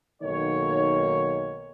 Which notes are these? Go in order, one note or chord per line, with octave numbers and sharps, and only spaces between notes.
B1 D#3 A#3 D#4 C#5